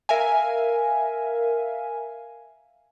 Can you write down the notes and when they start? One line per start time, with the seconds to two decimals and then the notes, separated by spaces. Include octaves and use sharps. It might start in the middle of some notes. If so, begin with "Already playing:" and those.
0.09 A#4 E5 F5 G#5